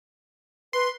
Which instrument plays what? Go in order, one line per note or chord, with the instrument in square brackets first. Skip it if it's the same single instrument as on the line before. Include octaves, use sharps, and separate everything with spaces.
[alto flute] B4 [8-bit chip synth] C6